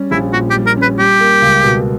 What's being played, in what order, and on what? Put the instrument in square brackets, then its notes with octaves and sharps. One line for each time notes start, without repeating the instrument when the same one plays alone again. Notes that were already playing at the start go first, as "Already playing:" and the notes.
Already playing: [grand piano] G3 C#4
[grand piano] A#1 [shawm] E4
[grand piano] A#2 [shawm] F#4
[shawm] G4
[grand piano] G3
[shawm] A#4
[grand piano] C#4 [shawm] B4
[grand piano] G3 [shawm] G4
[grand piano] A#3
C#2
B2